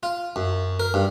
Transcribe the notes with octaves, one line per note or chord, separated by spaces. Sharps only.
F4
F#2
A#4
G2